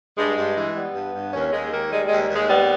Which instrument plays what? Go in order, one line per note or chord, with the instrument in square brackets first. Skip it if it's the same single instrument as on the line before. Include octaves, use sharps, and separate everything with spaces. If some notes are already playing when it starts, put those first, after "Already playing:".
[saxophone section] G2 G#3
G2
E3
G3 B3
G2
G2
D#2 C#4
D#2 G#3
D#3 A#3
G3 G#3
D#2 G#3
D#2 G#3
G3 B3